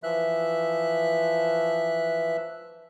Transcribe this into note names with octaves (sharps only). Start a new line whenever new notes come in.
E3 F3 E5 F#6